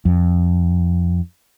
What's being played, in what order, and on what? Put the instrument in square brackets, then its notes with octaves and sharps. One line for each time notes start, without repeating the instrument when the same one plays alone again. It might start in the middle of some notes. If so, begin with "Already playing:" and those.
[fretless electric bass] F2